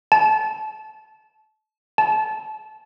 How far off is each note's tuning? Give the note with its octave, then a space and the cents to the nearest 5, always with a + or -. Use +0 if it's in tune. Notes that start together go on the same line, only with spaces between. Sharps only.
A5 -25
A5 -25